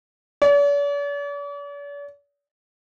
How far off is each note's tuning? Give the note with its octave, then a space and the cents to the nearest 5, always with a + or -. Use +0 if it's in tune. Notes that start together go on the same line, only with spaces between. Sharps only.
D5 -45